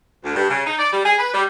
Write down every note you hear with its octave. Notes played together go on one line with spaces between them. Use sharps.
D2
G2
C#3
D#4
D5
G3
G#4
B4
G3